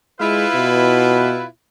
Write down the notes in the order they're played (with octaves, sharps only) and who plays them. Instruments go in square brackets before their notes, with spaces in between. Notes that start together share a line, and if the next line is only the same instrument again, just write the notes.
[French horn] G#3 [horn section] E4 F4 B4
[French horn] B2